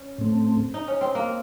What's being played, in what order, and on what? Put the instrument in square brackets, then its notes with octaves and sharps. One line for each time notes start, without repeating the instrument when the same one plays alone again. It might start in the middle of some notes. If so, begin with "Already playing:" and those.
Already playing: [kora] C#4
[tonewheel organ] A2 A3 C4
[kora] D#4
C#4
C4
A#3